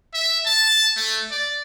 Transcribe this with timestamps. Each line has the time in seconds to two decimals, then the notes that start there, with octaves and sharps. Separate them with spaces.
0.14 E5
0.46 A5
0.97 A3
1.31 D5